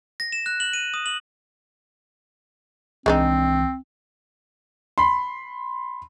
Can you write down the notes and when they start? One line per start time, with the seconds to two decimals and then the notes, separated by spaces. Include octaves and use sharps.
0.20 A#6
0.32 E7
0.46 F#6
0.60 F#7
0.73 D#7
0.94 D#6
1.06 F#7
3.06 C2 E3 G#3 C4 D4 D#4
4.98 B5 C6